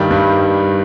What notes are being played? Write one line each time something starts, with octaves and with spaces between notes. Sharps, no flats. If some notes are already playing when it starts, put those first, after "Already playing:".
Already playing: G2 D#3 G3
G2